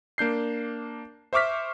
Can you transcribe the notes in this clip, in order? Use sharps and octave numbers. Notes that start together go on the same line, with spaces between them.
A#3 D4 G6 C7
C5 E5 C#6 D6 F6 B6